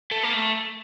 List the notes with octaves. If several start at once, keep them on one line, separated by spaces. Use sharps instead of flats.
A3
A#3
A3